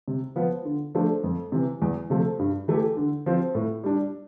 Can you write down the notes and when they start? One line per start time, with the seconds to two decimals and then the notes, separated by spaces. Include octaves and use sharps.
0.08 C3
0.36 F3 B3 F4
0.65 D3
0.95 F3 A3 D4
1.24 F2
1.52 C3 E3
1.82 E2
2.10 C3 F3 A3
2.39 G2
2.68 E3 A3 E4 G4
2.97 D3
3.26 F3 C4 F4
3.55 A2
3.84 G3 D4